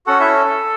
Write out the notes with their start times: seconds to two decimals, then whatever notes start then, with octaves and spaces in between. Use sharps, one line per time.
0.07 C#4 F#4 A4 F#5
0.20 E4 E5